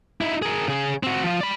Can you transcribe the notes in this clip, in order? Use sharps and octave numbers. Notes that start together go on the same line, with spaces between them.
D#4 E4
G#4 A#4
C#3 G#4
C4 F#4
F3 F4
D5 B5